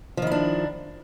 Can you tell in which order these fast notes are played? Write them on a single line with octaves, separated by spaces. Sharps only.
F3 D#3 E4 D4